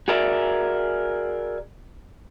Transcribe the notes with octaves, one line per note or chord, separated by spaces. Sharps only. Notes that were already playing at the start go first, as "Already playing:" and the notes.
F#4 G#4 A#4 D5 E5